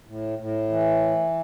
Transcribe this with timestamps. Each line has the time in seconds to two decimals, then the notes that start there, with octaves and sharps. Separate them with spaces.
0.07 A2
0.38 A2
0.70 E3